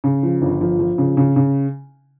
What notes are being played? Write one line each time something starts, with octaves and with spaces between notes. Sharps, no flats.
C#3
F3
G1
F3
F3
C#3
C#3
C#3